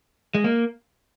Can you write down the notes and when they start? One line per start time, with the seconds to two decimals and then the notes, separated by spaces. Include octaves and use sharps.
0.35 G#3
0.44 A#3